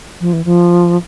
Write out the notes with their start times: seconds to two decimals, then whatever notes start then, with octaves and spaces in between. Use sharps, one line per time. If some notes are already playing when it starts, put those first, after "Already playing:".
0.20 F3
0.33 E3
0.45 F3